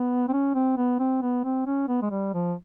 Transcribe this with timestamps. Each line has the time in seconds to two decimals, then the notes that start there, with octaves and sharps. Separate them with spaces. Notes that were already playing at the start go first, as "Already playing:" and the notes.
Already playing: B3
0.28 C4
0.33 C#4
0.55 C4
0.77 B3
1.00 C4
1.22 B3
1.44 C4
1.66 C#4
1.88 B3
2.02 G#3
2.11 G3
2.34 F3